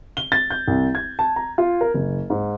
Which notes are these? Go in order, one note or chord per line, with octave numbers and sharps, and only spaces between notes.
G7
A6
G6
C2
G#6
A5
A#5
F4
A#4
F#1
G#2